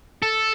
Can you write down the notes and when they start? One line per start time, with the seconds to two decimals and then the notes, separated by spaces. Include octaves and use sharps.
0.23 A4